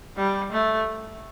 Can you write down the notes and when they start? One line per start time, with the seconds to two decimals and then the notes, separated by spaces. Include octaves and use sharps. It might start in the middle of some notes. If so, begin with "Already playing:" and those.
0.17 G3
0.52 A3